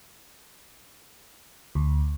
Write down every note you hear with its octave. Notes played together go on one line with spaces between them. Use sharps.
D2